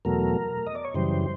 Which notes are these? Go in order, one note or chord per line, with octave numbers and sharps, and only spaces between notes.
E2 B2 F#3 A3 A#4
D#5
D5
C#5
F#2 C#3 E3 G3 C5